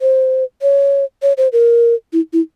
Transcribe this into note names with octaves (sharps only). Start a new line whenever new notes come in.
C5
C#5
C#5
C5
A#4
E4
E4